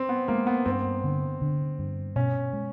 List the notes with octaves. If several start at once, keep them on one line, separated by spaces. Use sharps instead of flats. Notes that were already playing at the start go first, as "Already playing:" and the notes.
Already playing: C4
B3
G#3 A#3
B3
G2 C4
D3
D3
G2
B2 C#4
G#3